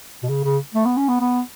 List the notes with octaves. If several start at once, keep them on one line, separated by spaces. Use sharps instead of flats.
B2
C#3
C#3
A3
B3
C#4
B3
B3